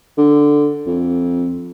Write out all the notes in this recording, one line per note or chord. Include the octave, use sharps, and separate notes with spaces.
D3
F2